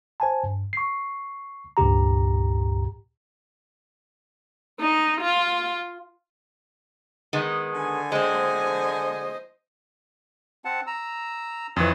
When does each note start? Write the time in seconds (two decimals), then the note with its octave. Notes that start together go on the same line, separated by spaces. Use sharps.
0.20 C5 G#5 A5
0.43 G2
0.73 C#6 C7
1.77 C#2 G2 A#2 G4 A#5
4.80 D#4
5.21 F4
7.33 D#3 G#3 B3
7.73 D3 G#5
8.12 G#3 C4 C5 D#5
10.65 C4 F#5 A5
10.87 A#5 E6
11.76 F2 E3 C#5 C6 D#6